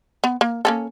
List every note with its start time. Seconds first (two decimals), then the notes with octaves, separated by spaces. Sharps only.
0.24 B3
0.41 A#3
0.65 A#3 C#4 A4